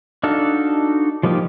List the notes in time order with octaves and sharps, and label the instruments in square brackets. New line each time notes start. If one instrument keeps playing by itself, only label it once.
[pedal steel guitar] D4 D#4 F#4 A4 F5
F3 G3 A#3 D#4 G4